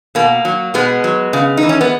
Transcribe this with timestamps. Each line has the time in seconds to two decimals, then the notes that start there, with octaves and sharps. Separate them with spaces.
0.15 B2 A#3
0.45 F#3
0.74 B2 G#3 B3
1.04 F#3
1.33 C#3
1.57 D#4
1.63 E3
1.69 C#4
1.81 B3